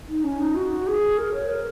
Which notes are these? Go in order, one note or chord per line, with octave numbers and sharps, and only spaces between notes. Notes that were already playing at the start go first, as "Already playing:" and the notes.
D#4
C#4
D#4
F#4
F#4
G#4
A#4
C#5
A#4